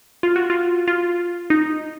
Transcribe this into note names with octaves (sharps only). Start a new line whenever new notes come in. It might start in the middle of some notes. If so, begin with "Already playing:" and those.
F4
F#4
F4
F4
D#4